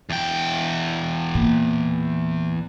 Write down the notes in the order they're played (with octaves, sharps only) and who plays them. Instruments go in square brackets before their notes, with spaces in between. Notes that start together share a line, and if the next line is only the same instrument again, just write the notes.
[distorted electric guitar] E2 G5
[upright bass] A#2